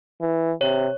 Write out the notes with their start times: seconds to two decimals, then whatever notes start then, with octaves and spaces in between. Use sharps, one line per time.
0.21 E3
0.61 C3 C#5